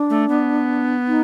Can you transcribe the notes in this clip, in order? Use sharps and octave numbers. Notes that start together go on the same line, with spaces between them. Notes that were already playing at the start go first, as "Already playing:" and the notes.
Already playing: D4
A3
B3
D#4